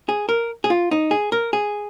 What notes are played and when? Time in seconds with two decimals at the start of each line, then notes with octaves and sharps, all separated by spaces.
0.09 G#4
0.29 A#4
0.64 G#4
0.70 F4
0.91 D#4
1.11 G#4
1.32 A#4
1.53 G#4